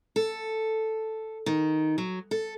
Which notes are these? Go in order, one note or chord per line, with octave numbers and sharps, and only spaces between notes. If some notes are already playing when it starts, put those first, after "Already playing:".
A4
D#3
F#3
A4